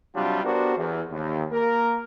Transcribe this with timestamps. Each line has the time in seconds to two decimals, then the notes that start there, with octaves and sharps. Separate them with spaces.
0.15 C3 F#3 G3 D4 F4
0.44 B3 D4 F#4 G4 A#4 C5
0.78 E2
1.11 D#2
1.52 A#3 A#4